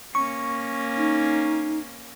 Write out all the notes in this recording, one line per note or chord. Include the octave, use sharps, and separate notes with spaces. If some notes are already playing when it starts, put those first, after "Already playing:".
A#3 C#4 C#6
D#4